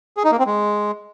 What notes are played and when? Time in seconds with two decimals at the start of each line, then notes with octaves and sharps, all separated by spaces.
0.17 G#4
0.24 D#4
0.32 A#3
0.39 C4
0.46 G#3